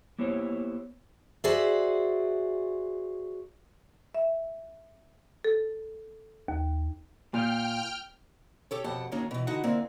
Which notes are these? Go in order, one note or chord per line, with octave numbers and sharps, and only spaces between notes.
A#3 B3 E4 G4 C5 C#5
F#4 G#4 C5 D5 E5
E5
A4
D#2
A#2 G5 F6
G4 A4 C#5
F2 B2 G4 F#5 A5
G#2 D#3 F#3 A#3 C#4 D4
B2 E3
D3 E3 D#4 F#4 F#5
D3 A#3 C4 E4 G#5